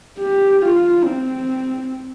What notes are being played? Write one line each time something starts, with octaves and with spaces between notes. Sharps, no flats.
G4
F4
C4